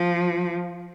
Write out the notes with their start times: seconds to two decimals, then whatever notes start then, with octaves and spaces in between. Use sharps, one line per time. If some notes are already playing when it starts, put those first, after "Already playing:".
Already playing: F3